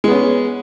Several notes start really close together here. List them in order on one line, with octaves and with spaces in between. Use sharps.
G#3 B3 C#4